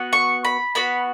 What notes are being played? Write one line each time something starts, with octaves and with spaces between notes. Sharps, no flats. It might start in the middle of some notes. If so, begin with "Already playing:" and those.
Already playing: B3 F#4
C#6
B5
B3 F#4 B5